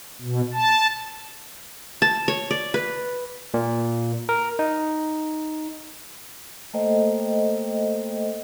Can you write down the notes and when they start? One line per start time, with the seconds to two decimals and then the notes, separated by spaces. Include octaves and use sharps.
0.22 B2
0.53 A5
2.02 A5
2.28 C#5
2.51 D5
2.74 B4
3.54 A#2
4.29 A#4
4.59 D#4
6.74 A3 A#3 A4 C5 D#5 G5